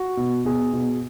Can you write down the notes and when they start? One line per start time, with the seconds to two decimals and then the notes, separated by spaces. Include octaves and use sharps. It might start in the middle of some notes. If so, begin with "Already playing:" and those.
Already playing: F#4
0.17 B2
0.45 B2 G#4
0.73 B2